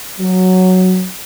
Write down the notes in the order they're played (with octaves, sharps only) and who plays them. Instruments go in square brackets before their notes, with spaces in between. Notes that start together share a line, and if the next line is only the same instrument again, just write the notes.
[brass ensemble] F#3